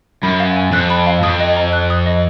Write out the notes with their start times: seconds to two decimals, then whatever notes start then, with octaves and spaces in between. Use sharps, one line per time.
0.23 F#2 B5
0.40 F5
0.56 G#5
0.73 F2 F#6
0.90 B5
1.07 F5
1.23 F2 D#6
1.40 D#5
1.57 A#5
1.73 F#6
1.90 D#6
2.06 D#5